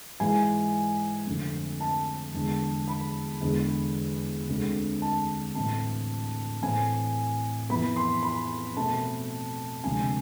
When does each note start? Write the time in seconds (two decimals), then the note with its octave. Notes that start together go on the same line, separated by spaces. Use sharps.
0.20 G#2 E3 G#3 G#5
1.27 F2 D3 A3 C4
1.81 A5
2.34 E2 D3 G#3
2.88 B5
3.41 E2 D3 G#3
4.48 D2 D3 G#3 C4
5.02 A5
5.55 A2 E3 A3 C4 A5
6.62 A2 E3 A3 C4 G#5
7.70 F2 E3 B3 B5
7.96 C6
8.23 B5
8.77 B2 A3 C4 A5
9.84 D2 C3 F3 G#3 C4 G#5